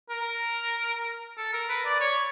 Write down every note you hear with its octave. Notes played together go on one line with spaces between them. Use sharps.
A#4
A4
A#4
B4
D5
C#5